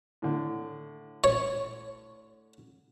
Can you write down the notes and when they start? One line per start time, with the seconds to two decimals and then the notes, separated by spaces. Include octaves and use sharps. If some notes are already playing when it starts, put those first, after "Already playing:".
0.22 A2 D3
1.24 C#5